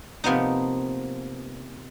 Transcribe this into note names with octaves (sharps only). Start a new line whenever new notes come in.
C3 F3 A#3 B3 D#4